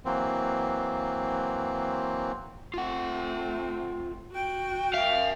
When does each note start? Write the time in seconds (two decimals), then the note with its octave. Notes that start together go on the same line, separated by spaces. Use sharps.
0.05 E3 F#3 A#3 C4
2.74 A3 C4 F4 F#5
4.32 F#4 G5
4.94 A#4 E5 F5